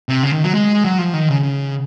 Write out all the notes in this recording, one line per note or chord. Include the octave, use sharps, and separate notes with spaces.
C3
C#3
D#3
F#3
G#3
F#3
F3
D#3
C#3
C#3